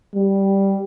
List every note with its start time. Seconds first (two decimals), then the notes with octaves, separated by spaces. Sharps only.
0.15 G3